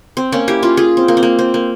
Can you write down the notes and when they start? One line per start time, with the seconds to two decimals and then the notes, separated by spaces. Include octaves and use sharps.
0.17 C4
0.32 A#3 C#4
0.48 E4 G4
0.62 C#4 F4
0.77 F4 G#4
0.97 C4
1.08 A#3
1.17 C4
1.23 A#3
1.39 C4
1.54 A#3